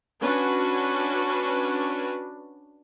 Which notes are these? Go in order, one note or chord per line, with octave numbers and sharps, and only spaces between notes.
C#4 D4 F#4 B4